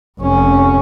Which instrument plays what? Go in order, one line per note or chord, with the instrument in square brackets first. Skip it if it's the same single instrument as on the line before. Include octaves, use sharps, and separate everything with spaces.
[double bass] F1 C#4